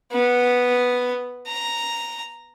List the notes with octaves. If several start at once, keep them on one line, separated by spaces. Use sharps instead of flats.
B3
A#5